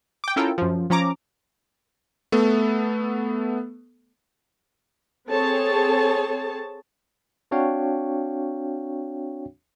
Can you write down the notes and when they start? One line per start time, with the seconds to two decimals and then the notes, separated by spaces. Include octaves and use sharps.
0.24 G5 D6
0.36 C#4 E4 F4 A4 A#4 G5
0.58 F#2 F3
0.90 F3 C#4 A#5 D6
2.32 A3 B3 A4
5.29 C4 G#4 A4 C#5 A5
7.51 C4 D4 F#4 C#5 F5 G5